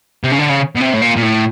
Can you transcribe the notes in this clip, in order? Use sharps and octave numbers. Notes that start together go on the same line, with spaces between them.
C3
C#3
D3
C#3
B2
C3
A2
A#2
A#2
A2